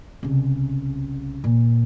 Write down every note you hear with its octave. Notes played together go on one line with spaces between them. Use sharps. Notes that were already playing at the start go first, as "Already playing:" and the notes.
C2 C#3
A#2